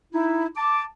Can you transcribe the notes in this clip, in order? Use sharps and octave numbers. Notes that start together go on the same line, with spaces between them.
D#4 E4
A5 D6